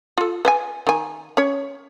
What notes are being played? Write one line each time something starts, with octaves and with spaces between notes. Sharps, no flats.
F4 A4
B4 E5 G#5
D#3 G#5
C#4 C#5